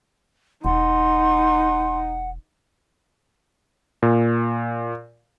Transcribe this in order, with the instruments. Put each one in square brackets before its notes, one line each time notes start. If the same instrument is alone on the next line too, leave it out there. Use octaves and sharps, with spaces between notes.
[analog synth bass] E1 [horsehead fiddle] D#4 [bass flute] F#5 [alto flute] C6
[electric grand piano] A#2